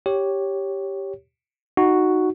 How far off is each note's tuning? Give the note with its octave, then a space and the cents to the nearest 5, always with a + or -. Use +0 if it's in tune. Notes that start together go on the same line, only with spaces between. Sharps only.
G4 +0 C#5 +0
D#4 +0 F#4 +0